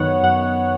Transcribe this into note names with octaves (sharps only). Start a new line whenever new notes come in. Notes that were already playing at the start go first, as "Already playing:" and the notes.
Already playing: F#2 D#3 B3 C#5 F#5
F#2 F#5